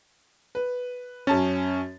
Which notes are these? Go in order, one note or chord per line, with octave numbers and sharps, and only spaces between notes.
B4
F#2 C#4 A5 A6